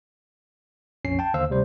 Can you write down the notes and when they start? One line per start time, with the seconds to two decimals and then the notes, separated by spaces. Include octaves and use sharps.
1.05 A#1 F2 C#4 C7
1.19 G5 A5
1.34 D#2 D3 C5 F5 E6
1.49 D2 C3 G3 C5